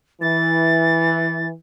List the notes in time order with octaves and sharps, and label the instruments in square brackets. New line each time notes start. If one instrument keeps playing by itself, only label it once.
[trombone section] E3 [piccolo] A6